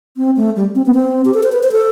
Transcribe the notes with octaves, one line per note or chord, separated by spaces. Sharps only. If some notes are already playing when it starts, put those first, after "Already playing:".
C4
A3
G3
C4
B3
C4
G4
A4
C5
B4
C5
A4